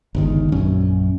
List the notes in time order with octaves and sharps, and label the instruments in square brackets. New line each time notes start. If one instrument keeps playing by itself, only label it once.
[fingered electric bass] G1 C#2 D#3
A#1 F#2 C#4